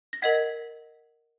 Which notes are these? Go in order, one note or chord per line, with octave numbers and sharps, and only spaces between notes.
A#6
A#4 D#5 F#5 G#6 B6